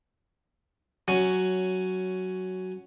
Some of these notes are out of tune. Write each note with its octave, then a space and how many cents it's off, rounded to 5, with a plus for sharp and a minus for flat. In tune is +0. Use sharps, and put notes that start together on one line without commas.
F#3 +5 C#4 +0